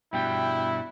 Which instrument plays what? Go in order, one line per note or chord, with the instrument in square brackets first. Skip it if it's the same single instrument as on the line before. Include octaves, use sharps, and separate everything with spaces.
[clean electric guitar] G2 B2 G3 [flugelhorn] E4 [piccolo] G5